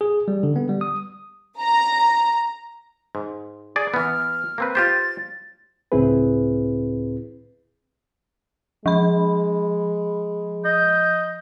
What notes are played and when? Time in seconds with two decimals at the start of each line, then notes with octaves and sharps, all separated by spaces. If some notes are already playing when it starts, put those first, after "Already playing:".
0.01 G#4
0.28 G3
0.43 D3
0.56 B3
0.69 G3
0.81 D#6
1.59 A#5
3.15 G#2
3.76 G#4 D5
3.94 E3 B3 F6
4.58 A#3 C4 B4
4.75 F4 G4 C5 A6
5.92 C#2 A2 C4 E4 G#4 B4
8.86 F3 G#3 B5
10.64 D#5 G6